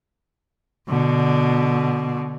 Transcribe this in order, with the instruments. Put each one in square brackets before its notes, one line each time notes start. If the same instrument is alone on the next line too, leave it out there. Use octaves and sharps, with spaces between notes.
[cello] B2 D3